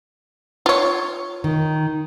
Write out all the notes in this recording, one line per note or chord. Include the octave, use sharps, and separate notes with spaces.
F4 C#5
D#3